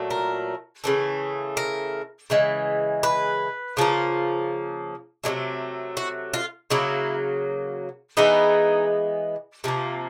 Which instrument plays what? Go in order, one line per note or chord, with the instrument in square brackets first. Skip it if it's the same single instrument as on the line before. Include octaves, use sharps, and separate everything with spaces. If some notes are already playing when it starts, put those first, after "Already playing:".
Already playing: [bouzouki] A#2 F#3 A3
A#4
C#3 E3 A3
A#4
C#3 E3 G#3
B4
C#3 F3 A#3
C3 D#3 F#3 A3
F#4
F4
C#3 F#3 A#3 E4
E3 G#3 B3 D#4
C3 F3 A#3